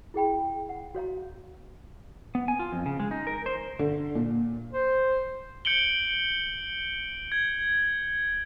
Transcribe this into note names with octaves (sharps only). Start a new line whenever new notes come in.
E4 G#4 G5 B5
F#5
F#4 C#5 F5 A#5
B3
G#5
F4
F2
C#3
G#3
D#4
A#4
C5
D3
A#2
C5
G6 C#7 D7 F#7 G7
G#6